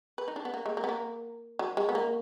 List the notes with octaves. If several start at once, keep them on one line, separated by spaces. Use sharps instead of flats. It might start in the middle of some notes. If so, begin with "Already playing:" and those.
B4
D#4
D4
B3
A#3
G#3
A#3
B3
A#3
F#3
G#3
B3
A#3